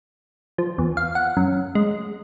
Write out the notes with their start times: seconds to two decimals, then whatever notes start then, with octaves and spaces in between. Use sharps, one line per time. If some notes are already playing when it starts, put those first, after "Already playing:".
0.58 F3
0.78 E2
0.97 F5
1.15 F#5
1.37 F#2
1.75 G#3